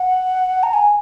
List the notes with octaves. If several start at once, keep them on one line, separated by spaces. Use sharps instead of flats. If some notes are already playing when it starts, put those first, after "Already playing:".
Already playing: F#5
A#5
G#5